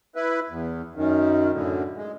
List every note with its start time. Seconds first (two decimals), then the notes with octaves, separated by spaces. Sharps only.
0.16 E4 B4
0.50 E2
0.95 F#2 D#3
1.53 F#2 A2 D3
1.96 G#3